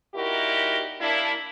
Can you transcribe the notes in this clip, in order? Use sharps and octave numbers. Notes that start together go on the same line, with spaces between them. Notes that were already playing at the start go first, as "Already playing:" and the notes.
A#2 D#4 E4 F#4 G4 A#4
A#3 D4 E4